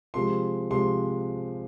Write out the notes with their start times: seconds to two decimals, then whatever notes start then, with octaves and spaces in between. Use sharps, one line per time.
0.14 C3 F3 G#3 C6
0.71 C3 F3 G#3 C6